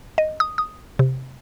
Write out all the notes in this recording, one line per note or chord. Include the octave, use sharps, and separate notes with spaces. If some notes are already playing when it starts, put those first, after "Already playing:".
D#5
D#6
D#6
C3